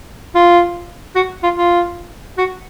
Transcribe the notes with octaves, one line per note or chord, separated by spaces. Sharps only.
F4
F#4
F4
F4
F#4